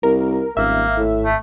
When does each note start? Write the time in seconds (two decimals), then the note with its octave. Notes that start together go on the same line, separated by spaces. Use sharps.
0.03 C2 A#4
0.57 D#1 G#1 A#3 E5
0.98 A2
1.24 A3